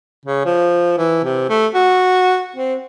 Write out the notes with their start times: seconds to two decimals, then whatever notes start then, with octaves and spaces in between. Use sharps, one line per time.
0.25 C#3
0.46 F3
0.98 E3
1.25 C3
1.49 A3
1.74 F#4
2.56 C4